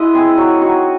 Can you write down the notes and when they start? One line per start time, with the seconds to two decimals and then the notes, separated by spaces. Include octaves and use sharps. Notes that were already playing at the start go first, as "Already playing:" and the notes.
Already playing: G#3 E4 D#5 F#5
0.14 C4 G#4
0.37 F#3 F#4
0.61 D#4 F#4